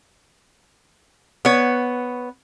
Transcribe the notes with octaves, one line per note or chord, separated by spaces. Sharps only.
B3 C#5